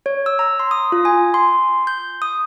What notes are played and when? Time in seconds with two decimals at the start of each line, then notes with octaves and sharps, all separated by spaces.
0.06 C#5
0.26 E6
0.39 A#5
0.60 C6
0.71 D#6
0.92 F4
1.05 G#5
1.34 C6
1.87 G6
2.22 D#6